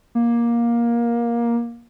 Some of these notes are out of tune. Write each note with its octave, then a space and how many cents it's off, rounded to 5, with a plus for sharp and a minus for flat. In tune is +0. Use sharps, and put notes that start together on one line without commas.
A#3 +15